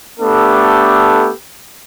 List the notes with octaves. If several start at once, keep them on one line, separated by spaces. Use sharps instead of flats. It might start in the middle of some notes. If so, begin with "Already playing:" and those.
A3 B3 D4 G4 A4